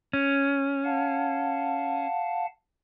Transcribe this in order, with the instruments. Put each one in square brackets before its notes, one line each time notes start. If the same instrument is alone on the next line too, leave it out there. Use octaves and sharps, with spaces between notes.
[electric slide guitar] C#4
[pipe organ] F5 F#5 A5